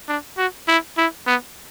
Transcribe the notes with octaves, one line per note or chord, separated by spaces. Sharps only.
D4
F#4
E4
E4
B3